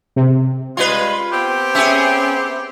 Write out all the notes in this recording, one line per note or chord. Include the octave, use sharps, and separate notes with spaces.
C3
G3 G#3 F4 B4 C6
B3 C4 G4
C#4 G#4 E5